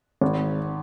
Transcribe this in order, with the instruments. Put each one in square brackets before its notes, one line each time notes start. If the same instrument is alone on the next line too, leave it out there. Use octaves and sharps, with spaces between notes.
[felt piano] G#1